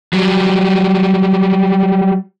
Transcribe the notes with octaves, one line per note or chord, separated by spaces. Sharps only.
F#3 G3